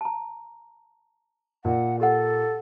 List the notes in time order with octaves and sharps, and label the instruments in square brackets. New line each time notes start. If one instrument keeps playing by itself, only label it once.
[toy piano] A5 A#5
[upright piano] A#2 [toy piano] D5 [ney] F#5
[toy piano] G4 F#5 [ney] A4